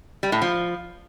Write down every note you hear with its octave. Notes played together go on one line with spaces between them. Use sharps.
G3
A2
F3